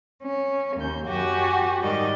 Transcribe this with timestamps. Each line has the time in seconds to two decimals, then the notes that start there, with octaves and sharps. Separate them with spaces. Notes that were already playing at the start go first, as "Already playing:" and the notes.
0.23 C#4
0.77 D#2 G6
1.08 F#2 F#4 G4 F#5 G#5
1.82 G#2 D#3 G3 D#5